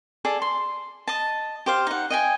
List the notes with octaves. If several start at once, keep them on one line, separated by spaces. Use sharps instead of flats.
G#4 A4 D5
C6
D#5 A5
G4 C5 F5
D#4 F#5
D#5 G5 G#5